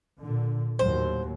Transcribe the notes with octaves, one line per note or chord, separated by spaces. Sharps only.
A#2 D3
D#2 A2 F#3 C5